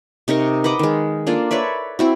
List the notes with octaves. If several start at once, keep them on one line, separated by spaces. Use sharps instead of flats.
C3 D#4 A#4 C#6
B4 D#5 F#5 D6
D#3 G#3
A#3 D4 F4 A4
B4 C#5 D5 E5
C4 E4 F#4